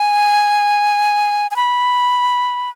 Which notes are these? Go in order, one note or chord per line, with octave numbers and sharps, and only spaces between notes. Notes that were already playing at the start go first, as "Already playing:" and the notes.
Already playing: G#5
G#5
B5